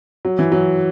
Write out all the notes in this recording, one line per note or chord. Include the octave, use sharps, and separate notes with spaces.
F#3
E3
F#3